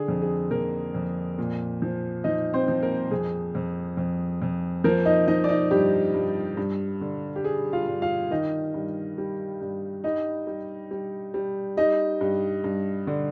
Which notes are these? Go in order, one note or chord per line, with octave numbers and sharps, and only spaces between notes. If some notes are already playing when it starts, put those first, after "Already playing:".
Already playing: D3 G#4
F2
G#4
F2 A#3 A#4
F2
A#2
F3
F3 D#4 D#5
C4 C5
F3
A#3 A#4
F2 G#4
F2
F2
F2
F3 A#3 A#4
D#4 D#5
F3 D#4 D#5
D5
D#4 D#5
G2 G4
G2
G2
D3
G4
G3 G#4
F4 F5
G2
F4 F5
D#3 D#4 D#5
G2
G3
G2
G3 D#4 D#5
G3
G3
G3
G3 D#4 D#5
G2
G2
D3